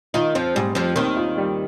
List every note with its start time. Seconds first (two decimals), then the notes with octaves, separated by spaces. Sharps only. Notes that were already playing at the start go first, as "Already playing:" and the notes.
0.14 D#3 D#4 F4
0.35 F2 F3 C4
0.55 G#2 G3
0.75 F2 F3 C4
0.96 D#2 D#3 C4
1.17 F4
1.38 G3